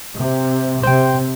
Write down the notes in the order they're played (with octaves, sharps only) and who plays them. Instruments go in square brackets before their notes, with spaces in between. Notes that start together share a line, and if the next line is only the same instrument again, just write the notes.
[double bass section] C3
[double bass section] C3 [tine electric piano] C5 G5